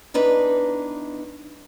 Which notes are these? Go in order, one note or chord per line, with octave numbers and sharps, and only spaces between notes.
E2 D4 D#4 B4